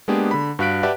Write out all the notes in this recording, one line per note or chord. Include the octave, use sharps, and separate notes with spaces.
G#3 A#3 B3 D4 G4 G#4
D3 B5
G2 F#4 F5 F#6 B6 D7
G4 B4 D5 E5 F#5 A5